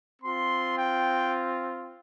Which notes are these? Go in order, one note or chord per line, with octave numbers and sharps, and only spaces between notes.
C4 F4 C6
G5